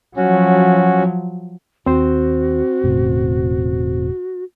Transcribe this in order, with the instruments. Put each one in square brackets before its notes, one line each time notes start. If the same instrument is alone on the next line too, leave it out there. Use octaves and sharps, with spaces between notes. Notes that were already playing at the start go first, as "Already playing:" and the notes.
[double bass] F3 F#3 [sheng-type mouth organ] C#4 F#4
[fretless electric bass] D#2 [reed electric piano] C4 C5 [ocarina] F#4
[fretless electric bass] E1 A2 C#3